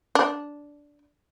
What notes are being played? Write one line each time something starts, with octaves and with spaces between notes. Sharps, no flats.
D4